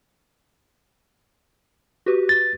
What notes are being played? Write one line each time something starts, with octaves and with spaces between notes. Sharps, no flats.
F#4 G4 B4
A6